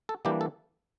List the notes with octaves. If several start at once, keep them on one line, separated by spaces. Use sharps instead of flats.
A4
E3 G3 A#3 D4 G4
A4